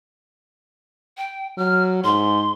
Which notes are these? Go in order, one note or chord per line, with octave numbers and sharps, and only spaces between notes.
G5
F#3 F6
G#2 C6